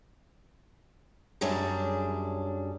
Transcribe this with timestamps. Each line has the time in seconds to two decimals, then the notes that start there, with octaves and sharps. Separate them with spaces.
1.41 F#2 F#3 G3 D4 G#4